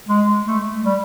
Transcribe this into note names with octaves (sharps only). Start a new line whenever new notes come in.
G#3
A3
G3